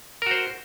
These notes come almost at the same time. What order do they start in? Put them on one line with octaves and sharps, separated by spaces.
A#4 F#4 C5